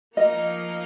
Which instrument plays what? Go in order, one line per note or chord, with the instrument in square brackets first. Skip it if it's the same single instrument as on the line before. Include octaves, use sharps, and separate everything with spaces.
[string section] F3 A#3 D#4 [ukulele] D#5